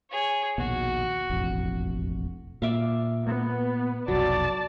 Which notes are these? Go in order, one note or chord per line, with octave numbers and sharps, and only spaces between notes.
G#4 C#5
A#1 D#2 B2 F#4
E1 A1 F2
A#2 D5 E5 F5
B3
F1 B1 F#3 D5 A5